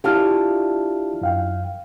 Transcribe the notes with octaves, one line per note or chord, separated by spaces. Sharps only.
D4 E4 F4 G4 A5 F6
F#2 F5 G5